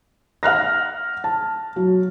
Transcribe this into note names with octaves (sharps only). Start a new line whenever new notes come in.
F#5 F6 F#6 A#6
A5
F#3